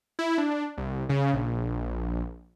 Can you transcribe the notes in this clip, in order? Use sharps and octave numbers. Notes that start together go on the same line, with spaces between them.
E4
D4
C2
C#3
A#1